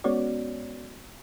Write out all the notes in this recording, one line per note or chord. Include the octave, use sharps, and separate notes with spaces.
G#3 B3 C#4 F#4 C#5 D5